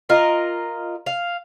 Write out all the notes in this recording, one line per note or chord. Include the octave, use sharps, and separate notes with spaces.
F4 A#4 D#5
F5